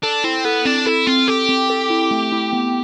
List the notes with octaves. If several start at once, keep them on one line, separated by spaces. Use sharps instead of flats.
D4 A4
C4 E4
B3 A4
C4 D4
E4 A4
C4 F4
G4 A4
C4
A4
E4
A3
E4
B3